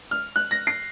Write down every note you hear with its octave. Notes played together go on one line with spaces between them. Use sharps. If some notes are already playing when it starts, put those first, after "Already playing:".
F6
F#6
A#6
C7